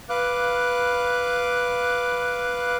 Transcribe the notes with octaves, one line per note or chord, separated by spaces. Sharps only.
B4 F5 D6 F#6